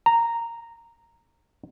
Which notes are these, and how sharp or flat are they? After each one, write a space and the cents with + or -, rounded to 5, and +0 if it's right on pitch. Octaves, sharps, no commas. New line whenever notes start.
A#5 -5